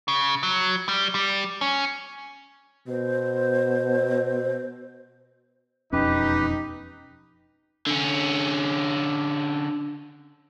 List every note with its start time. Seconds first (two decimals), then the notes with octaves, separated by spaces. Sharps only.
0.08 C#3
0.43 F#3
0.88 G3
1.15 G3
1.61 C#4
2.88 B2 C5
5.92 E1 F2 C#4 D#4 G4 B4
7.87 D3 C#4